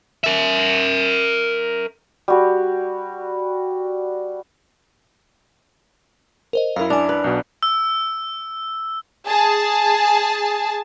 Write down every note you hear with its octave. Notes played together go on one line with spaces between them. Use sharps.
A#4 E5
G3 F#4
A#4 C5 D#5
F#2 E4 A#4 F5
D4 G#5 F7
B4
B1 B2
E6
G#4 A5